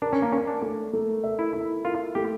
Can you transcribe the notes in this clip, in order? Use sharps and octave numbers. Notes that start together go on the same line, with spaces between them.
D4 A#4
C#4
A#3
C#4 A#4
D4
A3
A3
E5
E4
E4
F4 A#4
A3 G4